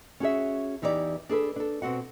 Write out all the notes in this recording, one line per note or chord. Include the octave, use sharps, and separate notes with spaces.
C#4 F#4 G#4 E5
E2 E3 D#4 G4 A4 D5
D4 G#4 A4 B4
D4 A4
B2 C4 F#4 F#5